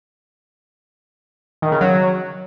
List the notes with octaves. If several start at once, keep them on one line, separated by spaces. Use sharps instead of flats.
D#3
C#3
F#3